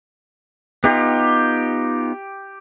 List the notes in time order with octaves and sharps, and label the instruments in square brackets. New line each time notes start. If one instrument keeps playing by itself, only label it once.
[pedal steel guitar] B3 D#4 F4 [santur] G4